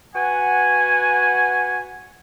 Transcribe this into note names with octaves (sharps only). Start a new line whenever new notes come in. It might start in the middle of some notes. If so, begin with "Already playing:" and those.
F#4 B4 F#5 G#5